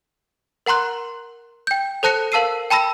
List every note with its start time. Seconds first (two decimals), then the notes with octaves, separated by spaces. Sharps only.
0.66 A#4 F#5 A#5 C6 F#6
1.67 G5 G6
2.03 A4 C5 A5 F#6 A#6 C#7
2.32 A#4 F5 A5 E6 C7 D#7
2.70 G5 A5 B5 E6 A#6